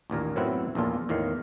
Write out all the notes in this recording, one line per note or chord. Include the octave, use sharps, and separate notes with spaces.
A1 D#2 A#2 A#4
F#2 A2 B3 C4 E4 F#5
A#1 E2 A#2 F4 A4
E2 A2 D#3 F5